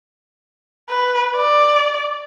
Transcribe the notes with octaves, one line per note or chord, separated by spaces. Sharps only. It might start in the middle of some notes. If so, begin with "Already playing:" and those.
B4
D5